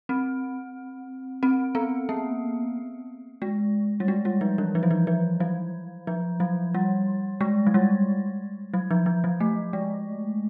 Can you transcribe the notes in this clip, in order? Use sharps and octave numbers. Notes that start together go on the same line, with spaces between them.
C4
C4
B3
A#3
G#3
G3
G#3
G3
F3
E3
F3
F#3
F3
F3
F#3
F3
F#3
G3
G#3
F#3
G3
F#3
F3
F3
F#3
A3
G#3